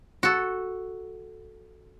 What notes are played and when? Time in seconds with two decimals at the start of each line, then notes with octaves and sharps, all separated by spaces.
0.23 F#4 A4